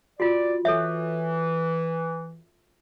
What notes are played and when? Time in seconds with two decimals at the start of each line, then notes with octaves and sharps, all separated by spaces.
0.20 F4 F#4 D5
0.65 E3 A4 C#5 E5